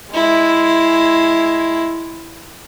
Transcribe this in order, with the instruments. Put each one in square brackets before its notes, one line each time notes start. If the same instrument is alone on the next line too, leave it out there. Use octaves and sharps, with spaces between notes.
[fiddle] G#3 E4